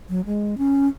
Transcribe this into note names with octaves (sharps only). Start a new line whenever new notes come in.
F#3
G#3
C#4